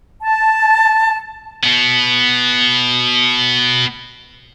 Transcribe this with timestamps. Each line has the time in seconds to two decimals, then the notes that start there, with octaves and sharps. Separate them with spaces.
0.22 A5
1.63 B2 B3